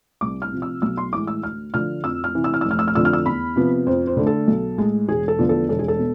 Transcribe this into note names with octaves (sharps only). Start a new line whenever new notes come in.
C2 D6
F6
C3 F3
E6
B1 E6
C6
A2 E3 G#3 D6
E6
D2 F6
D3 F3 F6
F2 E6
F6
C3 E3
E6
F6
E6
F1
F6
E6
F6
F2 D3 F3 E6
F6
E6
E2 B5
C3 F3 B3
F2 C5
C5
D3 A3 D4
A4
B1
A2 G#3
E1 G#4
A4
E2 D3 F3 B3
A4
E1 A4
G#4
A4
B2